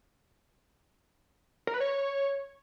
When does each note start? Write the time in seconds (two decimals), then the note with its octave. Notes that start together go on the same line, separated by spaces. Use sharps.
1.67 A#4
1.74 B4
1.80 C#5